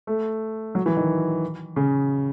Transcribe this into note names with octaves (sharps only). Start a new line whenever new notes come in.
A3
F#3
E3
D#3
C#3